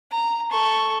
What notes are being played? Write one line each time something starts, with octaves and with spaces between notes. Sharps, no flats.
A#5
A4 C#6